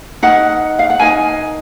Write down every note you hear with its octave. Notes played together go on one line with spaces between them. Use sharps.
D#4 A#4 F#5
F5
F#5
D#4 A#4 G#5